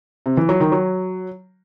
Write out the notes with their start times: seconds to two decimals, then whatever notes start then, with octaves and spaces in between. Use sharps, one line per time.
0.26 C3
0.37 E3
0.49 F#3
0.60 D#3
0.72 F#3